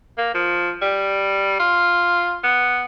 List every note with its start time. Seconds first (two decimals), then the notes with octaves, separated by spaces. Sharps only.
0.18 A#3
0.34 F3
0.82 G3
1.59 F4
2.43 B3